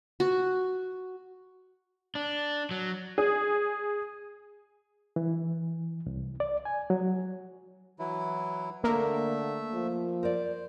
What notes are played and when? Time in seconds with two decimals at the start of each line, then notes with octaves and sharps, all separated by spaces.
0.20 F#4
2.15 D4
2.71 F#3
3.18 G#4
5.16 E3
6.06 C2
6.40 D5
6.65 G#5
6.90 F#3
7.99 E3 F#3 E4
8.84 D3 A3 A#3 E5
9.73 F3
10.23 A#4 C5 D5